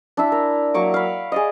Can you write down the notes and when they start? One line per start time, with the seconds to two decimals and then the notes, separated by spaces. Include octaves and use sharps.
0.17 D4 E4 E5
0.32 A#4
0.74 F#3 A#3 C#6 D6
0.94 F5 B5
1.32 G#4 D5 D#5